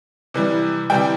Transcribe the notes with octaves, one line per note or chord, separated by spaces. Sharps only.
C3 E3 G3
C3 E3 G3 G5